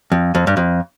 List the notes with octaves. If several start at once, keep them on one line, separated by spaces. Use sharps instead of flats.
F2
F2
G2
F2